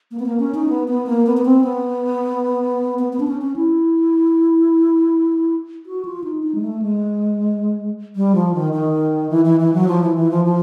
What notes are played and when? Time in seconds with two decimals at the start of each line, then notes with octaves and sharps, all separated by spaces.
0.11 A#3
0.19 B3
0.26 A#3
0.40 C#4
0.54 D#4
0.69 B3
0.88 B3
1.06 A#3
1.26 B3
1.37 B3
1.45 C4
1.64 B3
2.99 B3
3.13 B3
3.20 D4
3.27 C#4
3.42 C#4
3.56 E4
5.86 F#4
6.05 F4
6.24 D#4
6.43 D#4
6.55 G#3
6.62 A3
6.82 G#3
8.16 G3
8.35 F3
8.54 D#3
8.73 D#3
9.30 E3
9.45 E3
9.60 E3
9.74 F#3
9.88 F3
10.03 E3
10.17 E3
10.31 F3
10.45 F3